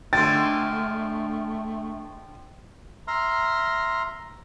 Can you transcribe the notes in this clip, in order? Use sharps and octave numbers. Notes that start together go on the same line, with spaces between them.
D3 F3 G#3 A3 G5 C6 A6
E5 A#5 C6 F6